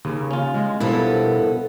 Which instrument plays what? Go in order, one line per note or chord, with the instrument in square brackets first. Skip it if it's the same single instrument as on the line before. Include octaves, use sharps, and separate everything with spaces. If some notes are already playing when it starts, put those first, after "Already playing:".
[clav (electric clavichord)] D#2 [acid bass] C#3
[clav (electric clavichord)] C#4 F4
[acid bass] G#3
[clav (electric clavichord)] G2 F3 [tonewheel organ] B2 A#4 [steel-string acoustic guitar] B3 A4 [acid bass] E4